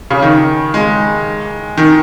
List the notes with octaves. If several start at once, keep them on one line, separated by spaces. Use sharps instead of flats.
C#3
D#3
G#3
D#3